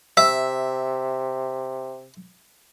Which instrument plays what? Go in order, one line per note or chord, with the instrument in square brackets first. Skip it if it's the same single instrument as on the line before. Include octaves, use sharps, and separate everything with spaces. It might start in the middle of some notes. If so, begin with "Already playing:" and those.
[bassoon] C3 [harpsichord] E5 [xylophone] E6